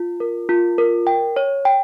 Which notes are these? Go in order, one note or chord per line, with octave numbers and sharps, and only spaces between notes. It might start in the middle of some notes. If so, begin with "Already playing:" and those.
Already playing: F4
A#4
F4
A#4
G5
C#5
G5